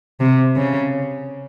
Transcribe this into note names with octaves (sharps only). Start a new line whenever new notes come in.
C3
C#3